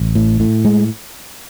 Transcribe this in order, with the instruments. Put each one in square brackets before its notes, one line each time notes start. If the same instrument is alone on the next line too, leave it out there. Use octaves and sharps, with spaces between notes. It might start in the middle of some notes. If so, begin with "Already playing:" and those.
Already playing: [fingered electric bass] A1
A2
A2
G#3